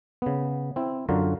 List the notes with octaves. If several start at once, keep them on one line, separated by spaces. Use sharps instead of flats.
C#3 B3
C4 E4
F#2 D3 F4 F#4 A#5